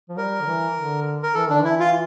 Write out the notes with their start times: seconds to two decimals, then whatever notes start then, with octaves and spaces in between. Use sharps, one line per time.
0.09 F3
0.17 G3 A#4
0.41 D3
0.46 E3
0.76 D3
1.23 A#4
1.35 E3 A4
1.49 D3 D4
1.62 E3 E4
1.80 F4